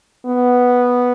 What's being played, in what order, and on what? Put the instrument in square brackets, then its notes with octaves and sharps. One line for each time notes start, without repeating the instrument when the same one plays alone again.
[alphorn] B3